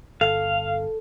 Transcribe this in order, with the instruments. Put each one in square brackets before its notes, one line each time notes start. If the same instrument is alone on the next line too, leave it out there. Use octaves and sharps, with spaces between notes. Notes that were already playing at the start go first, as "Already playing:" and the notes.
[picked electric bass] G1 [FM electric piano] A4 [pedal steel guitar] F5